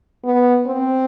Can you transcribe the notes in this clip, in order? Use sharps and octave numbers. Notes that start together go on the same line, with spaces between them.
B3
C4